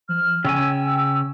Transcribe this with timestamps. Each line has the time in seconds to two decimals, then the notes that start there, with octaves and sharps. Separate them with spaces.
0.09 F3 F6
0.44 C#3 C#4 G5 G#5 E6